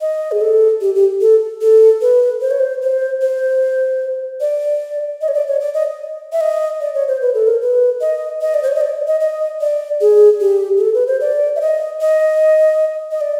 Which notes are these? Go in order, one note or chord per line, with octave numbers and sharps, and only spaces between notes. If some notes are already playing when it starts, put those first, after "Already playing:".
D#5
G#4
A4
G4
G4
A4
A4
B4
C5
C#5
C5
C5
C5
D5
D#5
C#5
D5
C#5
D5
D#5
E5
D#5
D5
C#5
C5
B4
A4
A#4
B4
D#5
D#5
D5
C5
C#5
D#5
D5
D#5
D#5
D5
G#4
G4
G#4
A4
B4
C5
D5
E5
D#5
D#5
D#5
D5